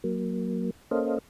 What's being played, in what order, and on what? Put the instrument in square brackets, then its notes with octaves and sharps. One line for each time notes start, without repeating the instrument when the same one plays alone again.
[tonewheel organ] F#3 A#3
A#3 C#4 A4 C5 D#5 F5